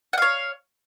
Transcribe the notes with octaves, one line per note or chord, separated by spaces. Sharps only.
C#5 F5 F#5